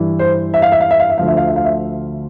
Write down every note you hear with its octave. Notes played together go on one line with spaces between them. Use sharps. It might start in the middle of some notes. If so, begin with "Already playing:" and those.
Already playing: G2 E3
C5
E5
F5
E5
F5
E5
F5
E5
D2 D3 F3 F5
E5
F5
E5
F5
E5